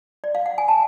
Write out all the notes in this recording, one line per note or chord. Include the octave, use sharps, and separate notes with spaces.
D5
F5
F#5
G#5
A5